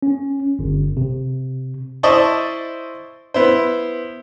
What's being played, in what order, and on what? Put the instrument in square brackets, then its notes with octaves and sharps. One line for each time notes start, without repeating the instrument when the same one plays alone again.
[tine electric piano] C#4
G1
C3
[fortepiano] E4 C5 D5 D#5 A5 C#6
B3 E4 C5